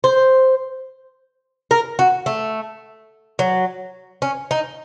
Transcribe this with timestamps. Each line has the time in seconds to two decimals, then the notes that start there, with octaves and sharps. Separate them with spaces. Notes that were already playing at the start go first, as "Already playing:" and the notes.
0.04 C5
1.71 A#4
1.99 F#4
2.26 A3
3.39 F#3
4.22 C#4
4.51 D#4